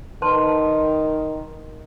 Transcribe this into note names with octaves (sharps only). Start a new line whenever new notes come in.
D#3 B4 A5 C6